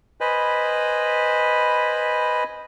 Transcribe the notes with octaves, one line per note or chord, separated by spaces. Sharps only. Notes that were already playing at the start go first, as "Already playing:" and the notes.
B4 C5 D#5 G#5 B5